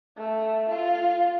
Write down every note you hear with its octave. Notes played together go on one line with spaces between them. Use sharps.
A3
F4